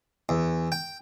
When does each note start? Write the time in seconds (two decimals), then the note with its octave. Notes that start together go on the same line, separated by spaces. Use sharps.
0.29 E2
0.72 G5